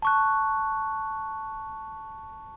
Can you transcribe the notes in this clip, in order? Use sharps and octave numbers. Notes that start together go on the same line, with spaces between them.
A5 C#6 F#6